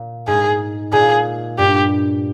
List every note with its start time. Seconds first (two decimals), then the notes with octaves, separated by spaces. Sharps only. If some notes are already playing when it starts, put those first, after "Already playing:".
Already playing: A#2
0.28 G#2 G#4
0.92 A#2 G#4
1.58 G2 G4